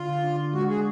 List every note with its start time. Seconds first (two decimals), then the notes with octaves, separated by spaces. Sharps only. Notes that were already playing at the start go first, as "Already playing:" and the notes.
Already playing: D3 F4
0.24 D4
0.54 G#3 F#4
0.70 G#4